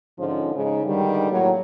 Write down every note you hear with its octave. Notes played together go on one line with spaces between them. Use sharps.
G#2 D3 F3 C#4
C#3 G#3 D#4
G2 D3 D#3 G3
A2 F#3 A#3 E4 C#5